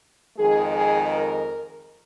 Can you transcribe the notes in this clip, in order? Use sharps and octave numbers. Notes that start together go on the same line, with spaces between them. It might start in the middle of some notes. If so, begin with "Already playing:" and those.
F2 D#3 G#3 G#4
G#4
A#4